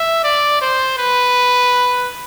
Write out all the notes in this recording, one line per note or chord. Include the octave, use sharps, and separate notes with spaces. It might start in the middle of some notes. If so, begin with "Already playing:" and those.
Already playing: E5
D5
C5
B4